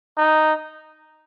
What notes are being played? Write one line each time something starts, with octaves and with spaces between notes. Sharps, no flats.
D#4